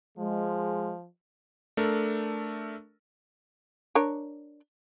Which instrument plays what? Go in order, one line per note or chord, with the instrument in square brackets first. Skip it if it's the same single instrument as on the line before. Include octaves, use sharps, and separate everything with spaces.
[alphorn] F3 [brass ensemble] G#3
[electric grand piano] A3 D4 A4 A#4
[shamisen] D4 A#4 C#5